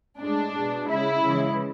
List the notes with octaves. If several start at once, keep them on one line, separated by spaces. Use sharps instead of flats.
A2 G#3 D4
B2 G#3
C#3 G#3 E4
C#3 E3 G#3